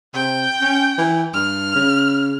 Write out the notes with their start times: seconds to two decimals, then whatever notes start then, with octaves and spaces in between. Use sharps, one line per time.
0.14 C3 G5
0.61 C#4
0.98 E3
1.34 G2 F6
1.75 C#3